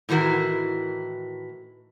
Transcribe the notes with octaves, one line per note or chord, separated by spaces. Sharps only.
A2 D#3 E3 F#4 A#4